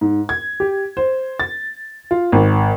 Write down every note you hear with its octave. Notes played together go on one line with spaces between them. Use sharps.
G#2
G#6
G4
C5
A6
F4
G#1